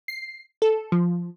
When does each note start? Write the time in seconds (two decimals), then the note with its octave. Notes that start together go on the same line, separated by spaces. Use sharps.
0.08 C7
0.62 A4
0.92 F3